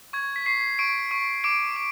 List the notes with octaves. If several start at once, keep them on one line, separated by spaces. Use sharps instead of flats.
C#6 G#6
B6
C#6 C7
C#6 D7
C#6
D6 D7
D6